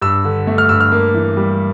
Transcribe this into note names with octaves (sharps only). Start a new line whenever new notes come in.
G2 E6
D3
A3
F6
G2 E6
F6
A#3
E3
G3